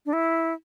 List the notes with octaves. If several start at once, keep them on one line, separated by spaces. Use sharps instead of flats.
D4
E4